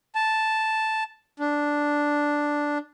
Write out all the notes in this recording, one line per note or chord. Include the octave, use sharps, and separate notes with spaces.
A5
D4